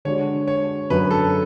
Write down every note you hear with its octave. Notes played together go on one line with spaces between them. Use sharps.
D3 G#3 D4 F#4 C#5
C#5
F#2 D3 F#3 C#4 B4
A4